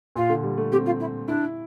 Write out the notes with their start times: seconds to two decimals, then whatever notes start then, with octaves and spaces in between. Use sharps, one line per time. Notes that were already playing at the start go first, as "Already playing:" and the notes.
0.16 A#2 F4
0.29 D3
0.43 G3
0.57 A3
0.72 C4 G4
0.86 F4
1.00 E4
1.28 D4 E4